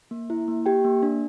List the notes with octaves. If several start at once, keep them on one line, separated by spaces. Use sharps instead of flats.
A#3
E4
A#3
G4 G5
A#3
D4